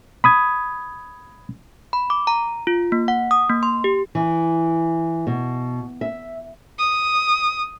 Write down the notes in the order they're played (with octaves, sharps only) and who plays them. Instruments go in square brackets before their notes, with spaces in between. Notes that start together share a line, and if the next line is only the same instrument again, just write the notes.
[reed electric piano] B5 D#6 G#6
[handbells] B5
D6
A#5
F4
A#3
F#5
D#6
A#3
C6
G4
[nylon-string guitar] E3
B2
E5
[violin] D#6